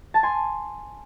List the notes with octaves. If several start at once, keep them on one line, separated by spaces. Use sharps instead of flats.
A5
G#5 C6